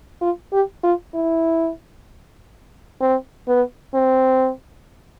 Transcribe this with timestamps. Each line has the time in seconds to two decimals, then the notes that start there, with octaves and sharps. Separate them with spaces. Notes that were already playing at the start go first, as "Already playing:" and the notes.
0.22 F4
0.53 G4
0.84 F4
1.14 E4
3.01 C4
3.48 B3
3.95 C4